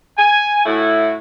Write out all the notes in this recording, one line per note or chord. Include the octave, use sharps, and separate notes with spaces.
G#5
A2 E4 F#4